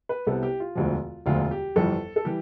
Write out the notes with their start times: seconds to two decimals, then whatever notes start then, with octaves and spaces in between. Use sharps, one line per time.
0.09 B4
0.27 C2 C3 G3 B3 A4
0.43 G4
0.60 F4
0.75 E1 D2 D3 F3
1.26 E1 D2 D3 F3 F4
1.51 G4
1.76 G1 F2 E3 G3 A4
2.16 A4
2.25 E3 G3 G4